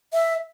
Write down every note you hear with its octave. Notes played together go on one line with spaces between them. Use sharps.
E5